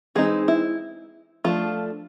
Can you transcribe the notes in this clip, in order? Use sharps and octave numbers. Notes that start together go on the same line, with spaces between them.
E3 G#3 C4 D#4 G#4
E4
F3 A3 D4 F4